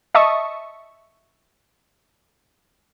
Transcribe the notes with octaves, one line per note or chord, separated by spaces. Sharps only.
D#5 E5 A5 C#6 D#6